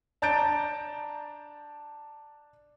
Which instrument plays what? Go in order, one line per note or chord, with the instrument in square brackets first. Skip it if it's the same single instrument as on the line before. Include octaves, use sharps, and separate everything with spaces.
[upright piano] D4 A5 A#5 G6 A6 D7